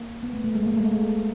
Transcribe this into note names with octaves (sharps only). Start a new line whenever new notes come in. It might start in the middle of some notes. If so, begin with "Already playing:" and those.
Already playing: A#3
B3
A3
A3
G#3
A#3
A3
G#3
A3